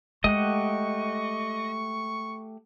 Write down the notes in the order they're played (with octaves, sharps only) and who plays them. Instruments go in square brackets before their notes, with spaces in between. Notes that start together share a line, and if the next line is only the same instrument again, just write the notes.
[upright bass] G#3 [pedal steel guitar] A3 G4 F#5 [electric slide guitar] D#5 [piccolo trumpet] C#6